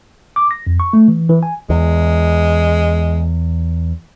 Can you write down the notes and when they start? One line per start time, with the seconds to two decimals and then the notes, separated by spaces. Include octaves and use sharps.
0.36 D6
0.51 A#6
0.67 F2
0.80 C#6
0.93 A3
1.08 E3
1.29 E3
1.43 G#5
1.70 E2 G#3